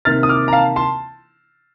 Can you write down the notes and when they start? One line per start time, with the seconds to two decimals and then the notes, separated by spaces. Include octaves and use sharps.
0.05 C3 D#3 A#3 F6 A6
0.23 D#6
0.29 D6 F6
0.48 A#5
0.53 F5 A5
0.76 A5 C6